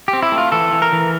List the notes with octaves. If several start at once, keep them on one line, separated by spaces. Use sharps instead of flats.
G4
C4
E4
A3
F4
E3 A4
E3
A#4
E3